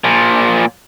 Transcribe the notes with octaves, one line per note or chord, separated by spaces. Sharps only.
A#2 F3